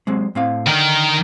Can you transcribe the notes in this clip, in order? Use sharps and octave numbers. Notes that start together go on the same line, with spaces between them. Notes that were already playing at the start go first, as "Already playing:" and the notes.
F#3 G#3 C4
A2 C4 F5
D3 D#3 A#4